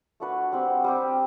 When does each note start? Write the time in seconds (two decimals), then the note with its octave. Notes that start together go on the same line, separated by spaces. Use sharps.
0.20 A3 D4 F#4 B4
0.52 G3 C4 G4
0.84 G3 C4 G4